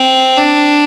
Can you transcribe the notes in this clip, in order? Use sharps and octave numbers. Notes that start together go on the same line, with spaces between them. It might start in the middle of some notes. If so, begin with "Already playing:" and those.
Already playing: C4
D4